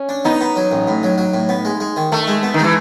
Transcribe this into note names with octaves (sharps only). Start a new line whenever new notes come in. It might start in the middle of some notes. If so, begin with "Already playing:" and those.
Already playing: C#4
D4
B3 D#4
B3
F#3
A1
A2
F#3
F#3
A2
B3
G#3
G#3
D#3
D#3 A3
G#3
B3
D#3
E3 G#3